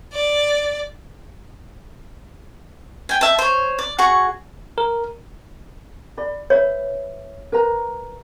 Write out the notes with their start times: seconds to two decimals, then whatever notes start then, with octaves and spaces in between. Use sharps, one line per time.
0.13 D5
3.09 G5 G#5
3.21 E5 A5
3.39 C5 C#5
3.79 D5
3.98 F#4 G#4 C#6
4.78 A#4
6.17 D5 B5
6.50 B4 C#5 E5
7.52 A#4 B4 A#5